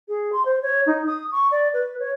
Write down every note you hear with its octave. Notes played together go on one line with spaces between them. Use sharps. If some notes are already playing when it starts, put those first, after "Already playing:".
G#4
C6
C5
C#5
D#4
D#6
C#6
D5
B4
C#5